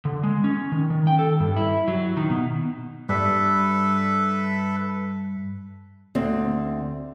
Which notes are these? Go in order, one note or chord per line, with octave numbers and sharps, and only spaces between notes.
D3
G#3
C#4
D#3
D#3
G5
A4
G2
E4
F#3
D#3
B2
G2 A4 B4 E5
D2 C4